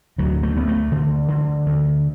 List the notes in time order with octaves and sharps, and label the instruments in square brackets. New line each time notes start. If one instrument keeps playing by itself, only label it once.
[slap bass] D2 F#3
A3
D2 B3
A3
D3
D3
D2